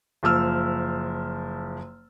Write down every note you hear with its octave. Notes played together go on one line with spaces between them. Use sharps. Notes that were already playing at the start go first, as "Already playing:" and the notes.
F#1 F3 E6 F6